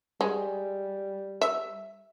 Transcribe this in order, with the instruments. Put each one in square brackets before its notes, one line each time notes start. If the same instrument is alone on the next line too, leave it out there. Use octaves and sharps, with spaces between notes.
[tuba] G3 [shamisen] G#3
[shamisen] E5